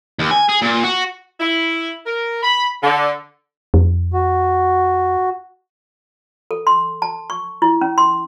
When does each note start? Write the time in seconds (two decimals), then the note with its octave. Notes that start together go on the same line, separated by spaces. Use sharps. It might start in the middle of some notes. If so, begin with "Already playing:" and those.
0.19 D#2
0.31 G#5
0.49 G#4
0.62 A#2
0.84 F#4
1.40 E4
2.06 A#4
2.43 B5
2.82 D3
3.74 F2
4.13 F#4
6.51 A4
6.67 C6
7.02 A5
7.30 C#6
7.62 E4
7.81 C#4
7.98 C6